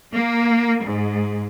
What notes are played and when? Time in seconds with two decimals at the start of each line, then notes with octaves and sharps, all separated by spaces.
0.13 A#3
0.83 G#2